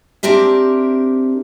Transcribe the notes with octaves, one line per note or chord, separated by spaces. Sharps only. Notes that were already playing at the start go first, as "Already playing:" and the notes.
C4 D4 G4 A#4 E5